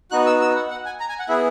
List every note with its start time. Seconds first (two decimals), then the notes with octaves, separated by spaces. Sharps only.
0.11 B3 D#4 F#4 F#6
0.26 E6
0.41 E6
0.55 F#5
0.70 F#5
0.85 G#5
1.00 A#5
1.09 G#5
1.19 F#5
1.29 B3 E4 G#4 E5